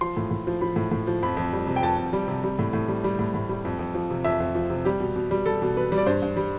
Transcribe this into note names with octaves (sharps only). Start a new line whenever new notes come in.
F3 C6
A2
A2
F3
F3 B5
A2
A2
F3
F2 B5
F2
G3
C3
G5
F2 A5
F2
G3
C3
G3
A2
A2
G3
G3
A2
A2
G3
F2
F2
F3
C3
F2 E5
F2
F3
C3
G3 G4
B2
B2
G3
G3 A4
B2
B2 B4
G3
D5
G2 C5
G2
G3